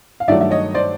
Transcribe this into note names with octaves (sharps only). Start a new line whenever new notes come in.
F5
G2 D#3 F#3 A3 D5 E5
E5
C#5 D#5
C5 D5